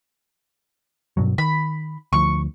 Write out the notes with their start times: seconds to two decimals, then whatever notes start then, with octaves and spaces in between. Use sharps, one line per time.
1.17 G2 B2 F#3
1.38 D#3 B5
2.13 D2 F3 C#6